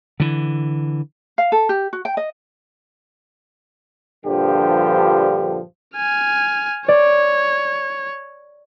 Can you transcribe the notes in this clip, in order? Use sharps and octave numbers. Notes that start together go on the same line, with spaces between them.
D3 E3
F5
A4
G4
F#4
G5
D#5
A#1 G2 D3 F3 G4
G#5 F6
C#5 D5